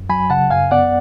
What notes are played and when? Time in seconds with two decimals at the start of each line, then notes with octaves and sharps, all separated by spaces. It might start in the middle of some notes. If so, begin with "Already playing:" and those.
Already playing: F#2
0.09 F#3 G#5 B5
0.30 C#3 F#5 A5
0.50 F#2 F5 G#5
0.71 B3 D5 F#5